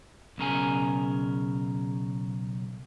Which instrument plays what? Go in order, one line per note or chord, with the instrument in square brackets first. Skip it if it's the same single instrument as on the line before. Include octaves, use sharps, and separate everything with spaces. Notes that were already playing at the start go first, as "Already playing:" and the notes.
[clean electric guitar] B1 C#3 A#4 G#5